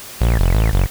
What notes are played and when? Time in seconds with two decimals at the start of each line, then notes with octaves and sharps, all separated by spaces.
0.21 A#1
0.39 F1
0.54 A1
0.73 F#1